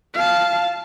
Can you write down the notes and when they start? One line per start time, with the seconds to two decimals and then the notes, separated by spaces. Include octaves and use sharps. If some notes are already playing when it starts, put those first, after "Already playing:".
0.14 F5 A5